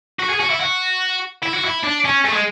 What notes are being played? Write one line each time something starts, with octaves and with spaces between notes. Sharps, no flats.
F#4
G#4
F#4
E4
F#4
E4
F#4
E4
D4
C#4
A3
G#3